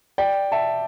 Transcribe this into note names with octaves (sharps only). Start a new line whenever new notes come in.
D5 G5
E5 A5